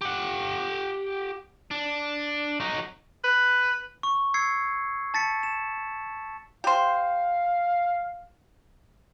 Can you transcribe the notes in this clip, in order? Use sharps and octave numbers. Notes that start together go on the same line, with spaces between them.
G4 F#5
D4
F#3 D#4
B4
C#6
E6 G#6 C7 C#7
A5 A6 B6 C#7
E7
G4 C5 F5